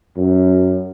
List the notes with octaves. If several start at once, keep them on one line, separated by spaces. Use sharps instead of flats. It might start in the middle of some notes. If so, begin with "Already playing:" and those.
F#2